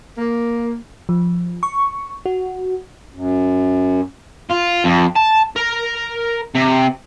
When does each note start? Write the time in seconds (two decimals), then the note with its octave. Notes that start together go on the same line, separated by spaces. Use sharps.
0.17 A#3
1.09 F3
1.63 C#6
2.26 F#4
3.14 F#2
4.51 F4
4.85 F2
5.16 A5
5.56 A#4
6.55 C3